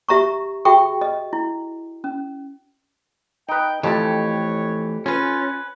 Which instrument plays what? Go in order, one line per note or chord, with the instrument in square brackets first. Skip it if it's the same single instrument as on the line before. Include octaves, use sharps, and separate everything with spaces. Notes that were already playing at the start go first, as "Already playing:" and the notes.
[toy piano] G4 E5 A#5 C#6
F#4 G#4 E5 G5 C#6
D#5
E4
C#4
[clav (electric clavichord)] D#4 B4 [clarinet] G5
[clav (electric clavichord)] F2 A5 [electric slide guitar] E3 A3 [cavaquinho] G4 [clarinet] C#5
[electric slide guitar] C#4 [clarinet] F4 [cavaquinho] B4 G#5